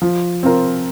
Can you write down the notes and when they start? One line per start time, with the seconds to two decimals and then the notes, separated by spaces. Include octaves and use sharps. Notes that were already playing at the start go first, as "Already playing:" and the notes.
0.02 F3
0.43 C4 F4 A#4